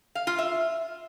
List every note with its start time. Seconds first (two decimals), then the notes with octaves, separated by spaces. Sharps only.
0.15 F5
0.27 F4
0.39 E5